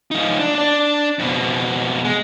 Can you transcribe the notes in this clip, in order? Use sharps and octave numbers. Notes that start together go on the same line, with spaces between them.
F3 D#4
D4
D4 D5
F2 B2
G#3